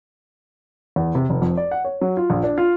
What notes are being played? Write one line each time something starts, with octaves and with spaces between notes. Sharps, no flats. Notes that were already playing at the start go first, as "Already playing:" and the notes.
E2
C3
F1
F2
D5
F#5
C#5
F#3
F4
A#1
D4
F4